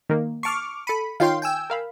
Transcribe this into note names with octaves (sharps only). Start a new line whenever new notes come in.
D#3 A#3
A5 C#6 D6 F6 C7
A4 B5 C#7 D#7
D#3 F4 C#5 F5 G5 C6
G5 G#5 E6
A#4 F5 B5